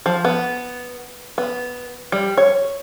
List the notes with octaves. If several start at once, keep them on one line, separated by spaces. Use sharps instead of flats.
F3
B3
B3
G3
C#5